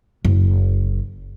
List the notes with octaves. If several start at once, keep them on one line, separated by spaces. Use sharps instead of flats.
F#1